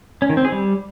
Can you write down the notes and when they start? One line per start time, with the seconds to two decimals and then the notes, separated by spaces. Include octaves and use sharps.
0.22 C#4
0.29 D#3
0.37 C4
0.45 G#4
0.52 G3